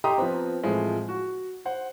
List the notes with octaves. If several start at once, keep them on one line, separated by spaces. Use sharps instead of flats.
G4 D#5 G5 A#5 C6 D#6
F3 B3 C4
A2 E3 F3 G#3 C4 E4
F#4
C5 F#5